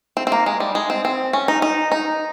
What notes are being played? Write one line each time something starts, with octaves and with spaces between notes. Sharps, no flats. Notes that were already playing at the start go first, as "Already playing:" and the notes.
C4
C4
A#3
G#3
G3
G#3
C4
C4
C#4
D#4
D#4
D#4